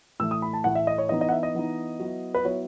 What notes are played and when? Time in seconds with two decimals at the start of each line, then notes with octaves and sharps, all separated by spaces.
0.20 A2 E3 A3 E6
0.31 D#6
0.42 B5
0.53 A5
0.64 A2 E3 A3 F#5
0.75 E5
0.87 D#5
0.98 C#5
1.09 E3 B3 D#4 D#5
1.21 D#5
1.29 F#5
1.32 E5
1.43 D#5
1.54 E3 B3 D#4
2.00 F#3 B3 E4
2.34 B4
2.45 F#3 B3 E4 C#5